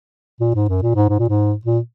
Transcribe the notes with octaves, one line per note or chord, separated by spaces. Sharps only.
A#2
G#2
F#2
A#2
G#2
G#2
A#2
G#2
A#2